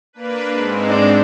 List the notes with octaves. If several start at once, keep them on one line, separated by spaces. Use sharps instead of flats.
A#3 D4 B4
G#2 G#3 C4
D4